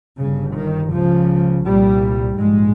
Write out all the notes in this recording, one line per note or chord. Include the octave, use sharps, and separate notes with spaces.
G1 G2 C#3
D#3
C#2 C#3 F3
C2 A#2 G3
A#1 G#2 G#3